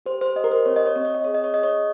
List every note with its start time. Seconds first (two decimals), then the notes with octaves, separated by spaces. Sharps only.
0.06 G4 C5
0.21 C5
0.36 G4 D#5
0.44 A#4
0.51 C5
0.66 C4 C#5
0.76 D#5
0.86 C#5
0.96 C4 D#5
1.05 C#5
1.14 D#5
1.24 G#4 C#5
1.35 D#5
1.44 C#5
1.54 G#4 D#5
1.63 C#5